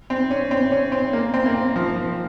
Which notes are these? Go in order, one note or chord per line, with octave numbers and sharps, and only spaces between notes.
C4
C#4
C4
C#4
C4
A#3
C4
A#3
C4
F3
F3